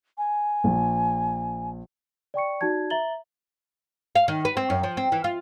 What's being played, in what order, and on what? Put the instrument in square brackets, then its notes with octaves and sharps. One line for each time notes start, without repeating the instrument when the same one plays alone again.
[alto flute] G#5
[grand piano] A#1
[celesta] D5 G5 C#6 C#7
D#4 F#4 D5 A5 G#6
E5 A#5 A6 F#7 G7
[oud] F5
D#3
B4
C4
F#2
F3
C4
E3
F4